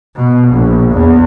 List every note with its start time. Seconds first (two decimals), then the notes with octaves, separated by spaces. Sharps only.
0.16 B2
0.48 A#1
0.93 E2